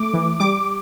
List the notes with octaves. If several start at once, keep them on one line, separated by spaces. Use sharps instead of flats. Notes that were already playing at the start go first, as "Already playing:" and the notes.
Already playing: A3 D6
E3
G3 D6